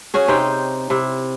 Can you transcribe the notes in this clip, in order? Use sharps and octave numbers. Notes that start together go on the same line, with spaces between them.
C#4 F#4 G#4
C3 D#4 C5 G5
C3 E4